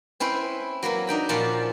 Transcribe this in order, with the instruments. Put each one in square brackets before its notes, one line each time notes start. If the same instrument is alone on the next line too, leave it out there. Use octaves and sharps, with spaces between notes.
[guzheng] C4 C#4 E4 B4 C5
F#3 A#3 E4 B4
D4 D#4 G5 B5
A#2 F3 C#4 D5 F#5 A5